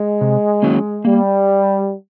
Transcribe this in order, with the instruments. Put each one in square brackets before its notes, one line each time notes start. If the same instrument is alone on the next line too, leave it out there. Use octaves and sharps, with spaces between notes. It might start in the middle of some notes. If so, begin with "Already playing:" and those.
Already playing: [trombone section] G#3
[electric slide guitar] C3
D#3 F#3 A#3 C#4
[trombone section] G3 [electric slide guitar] A#3